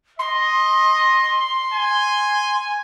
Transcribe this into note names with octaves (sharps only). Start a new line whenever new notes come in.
D#5 C6
G#5